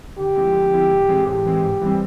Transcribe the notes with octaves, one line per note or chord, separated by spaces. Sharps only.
D3 G4
F3 G#3 C4 E4
D3
F3 G#3 C4 E4
A2
E3 G#3 C4
A2 G4
E3 G#3 C4
G#2
E3 G3 C4